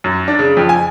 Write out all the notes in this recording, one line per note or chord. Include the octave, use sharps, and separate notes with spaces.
F#2
D4
C#3
F2
G#5